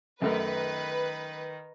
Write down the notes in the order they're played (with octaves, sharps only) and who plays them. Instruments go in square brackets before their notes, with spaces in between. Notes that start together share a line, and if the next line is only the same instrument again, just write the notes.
[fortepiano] F#2 A3 A#4 [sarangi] D#3 [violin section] B4